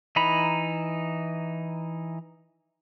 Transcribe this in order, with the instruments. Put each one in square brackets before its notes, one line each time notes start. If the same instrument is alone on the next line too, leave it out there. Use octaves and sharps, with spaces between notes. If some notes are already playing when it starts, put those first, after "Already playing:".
[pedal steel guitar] E3 D#4 A#5 B5